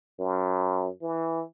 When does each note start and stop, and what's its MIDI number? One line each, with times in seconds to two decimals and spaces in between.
0.20 0.89 42
1.02 1.43 52